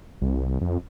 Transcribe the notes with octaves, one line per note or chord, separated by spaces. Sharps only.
C2
F2